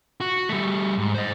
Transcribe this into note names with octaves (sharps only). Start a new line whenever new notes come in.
F#4
G3 A3
G#2
C5 D#5